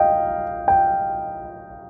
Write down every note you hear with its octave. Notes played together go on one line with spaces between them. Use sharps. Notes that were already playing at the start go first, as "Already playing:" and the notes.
Already playing: D#5 F5 G5
G5